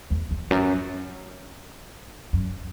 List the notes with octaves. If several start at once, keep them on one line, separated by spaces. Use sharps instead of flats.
E2
E2
F#2
F#2